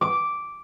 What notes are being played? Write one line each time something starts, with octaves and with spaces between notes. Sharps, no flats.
D6